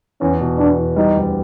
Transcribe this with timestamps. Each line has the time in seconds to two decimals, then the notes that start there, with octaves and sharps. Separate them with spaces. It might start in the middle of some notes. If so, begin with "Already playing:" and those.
0.21 E2 C#4
0.40 B2
0.59 E2 D4
0.78 E2
0.96 G3 D#4
1.16 D2